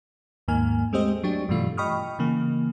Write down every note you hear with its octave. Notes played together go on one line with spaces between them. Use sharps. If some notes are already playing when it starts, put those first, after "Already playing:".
D#2 G#2 D#3 A#3 G#5 F6
G#3 A3 C4 G4 C5 D#5
F#3 D4 G4
G2 B2 E3 A3 F4
D#5 G5 B5 C#6 D#6 F6
C#3 E3 A#3